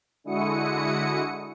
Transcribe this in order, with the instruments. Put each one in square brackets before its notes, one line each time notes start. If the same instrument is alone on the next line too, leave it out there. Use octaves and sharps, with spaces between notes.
[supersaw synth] D3 G#3 E4 F#4 D#6 C#7